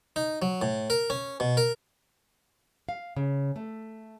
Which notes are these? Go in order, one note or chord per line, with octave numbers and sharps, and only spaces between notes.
D#4
F#3
A2
A#4
C#4
B2
A#4
F5
C#3
A3